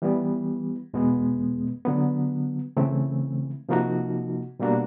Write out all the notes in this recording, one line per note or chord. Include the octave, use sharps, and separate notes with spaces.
E3 G3 B3
E2 B2 G#3 B3
D3 F#3 B3
C#3 E3 A3 C4
C3 F3 A#3 D#4 F#4
B2 G3 A#3 D4 F#4